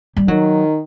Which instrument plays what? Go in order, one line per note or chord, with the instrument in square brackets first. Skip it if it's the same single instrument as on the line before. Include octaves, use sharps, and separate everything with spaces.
[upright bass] G3
[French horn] D#3 [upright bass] F#3